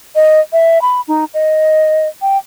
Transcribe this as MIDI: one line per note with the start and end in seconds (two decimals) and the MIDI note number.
0.15 0.40 75
0.53 0.81 76
0.82 1.01 83
1.08 1.25 63
1.34 2.08 75
2.22 2.38 79